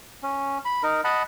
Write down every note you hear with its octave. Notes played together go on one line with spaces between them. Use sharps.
C#4
B5
D#4 A#4
D#5 F#5 A5 B5